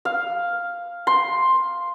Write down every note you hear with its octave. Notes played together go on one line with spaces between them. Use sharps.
F5
C6